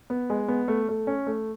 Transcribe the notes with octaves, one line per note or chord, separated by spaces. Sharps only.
B3
G#3
B3
A3
A3
C#4
A3